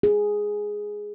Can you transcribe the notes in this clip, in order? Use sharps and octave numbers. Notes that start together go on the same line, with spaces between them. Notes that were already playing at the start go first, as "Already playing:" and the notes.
G#4